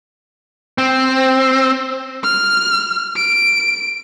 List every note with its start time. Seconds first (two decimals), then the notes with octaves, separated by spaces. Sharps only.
0.78 C4
2.24 F6
3.16 D7